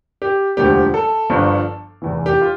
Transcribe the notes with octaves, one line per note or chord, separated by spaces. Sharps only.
G4
E1 D2 D3 F3 G4
A4
G1 G2 F3
F1 E2 E3
G4
F4